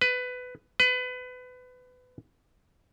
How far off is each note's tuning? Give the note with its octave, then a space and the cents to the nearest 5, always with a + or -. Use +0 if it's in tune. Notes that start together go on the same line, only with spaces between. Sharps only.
B4 +15
B4 +25